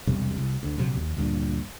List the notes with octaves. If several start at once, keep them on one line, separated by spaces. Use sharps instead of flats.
E1 B1 C3 G3
C2
D2
A#1 C3 F#3
D#2
D2 G2 A#2